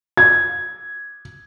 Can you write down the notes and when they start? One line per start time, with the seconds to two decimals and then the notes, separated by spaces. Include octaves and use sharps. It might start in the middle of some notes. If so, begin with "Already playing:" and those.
0.17 G#6